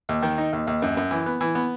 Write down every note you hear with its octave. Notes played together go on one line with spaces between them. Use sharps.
D#2
D#3
D#4
D#2
D#2
F#2
F#2
E3
B3
E3
B3